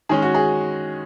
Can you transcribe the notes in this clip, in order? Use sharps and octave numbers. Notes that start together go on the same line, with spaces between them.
D#3 G#3 C#4 G#4
F#4
G#4